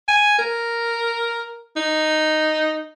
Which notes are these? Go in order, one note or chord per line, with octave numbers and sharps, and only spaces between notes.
G#5
A#4
D#4